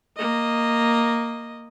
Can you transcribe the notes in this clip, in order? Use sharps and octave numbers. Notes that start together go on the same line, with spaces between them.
A#3 D#5